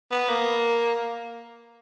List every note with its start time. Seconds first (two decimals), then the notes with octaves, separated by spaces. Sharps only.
0.11 B3
0.29 A#3